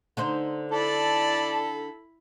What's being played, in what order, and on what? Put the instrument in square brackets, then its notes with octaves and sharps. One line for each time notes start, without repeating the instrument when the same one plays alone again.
[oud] D3 D#4 C5
[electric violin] E4 B5 [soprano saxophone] A4 [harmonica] D5 A5